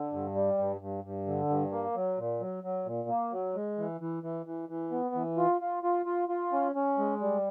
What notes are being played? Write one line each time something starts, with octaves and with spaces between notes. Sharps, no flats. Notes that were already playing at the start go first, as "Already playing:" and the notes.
Already playing: D3
G2
G3
G2
G2
G2
D3
G2
A#3
F#3
A#2
F#3
F#3
A#2
A#3
F#3
G#3
E3
E3
E3
E3
E3
B3
E3
F4
F4
F4
F4
F4
C#4
C#4
G#3
G3